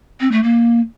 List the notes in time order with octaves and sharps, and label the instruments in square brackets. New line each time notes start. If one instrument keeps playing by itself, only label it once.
[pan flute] C4
A3
A#3